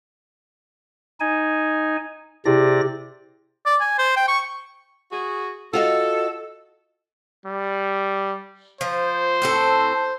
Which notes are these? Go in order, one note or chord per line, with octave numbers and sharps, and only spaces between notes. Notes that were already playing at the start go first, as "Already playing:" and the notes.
D#4 G#5
C3 E4 G4 G#4 D5 A#6
D5
G#5
C5
G5
C#6
F#4 G#4
F4 F#4 A4 D#5
G3
F3 C5
A2 C4 A4